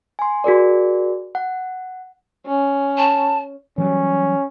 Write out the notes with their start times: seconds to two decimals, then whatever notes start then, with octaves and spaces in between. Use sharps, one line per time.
0.19 G#5 C6
0.44 F#4 G#4 A#4 D5
1.35 F#5
2.47 C#4
2.98 A5
3.78 E3 F#3 G3 C#4